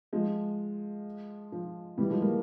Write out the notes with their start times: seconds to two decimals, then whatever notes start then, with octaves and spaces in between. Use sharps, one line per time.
0.13 F3 G#3
1.52 F3
1.98 E3 G3
2.09 F3 G#3
2.21 G3 A#3